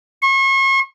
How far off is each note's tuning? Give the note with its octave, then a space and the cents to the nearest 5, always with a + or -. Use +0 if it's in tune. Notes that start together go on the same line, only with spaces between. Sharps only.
C#6 -40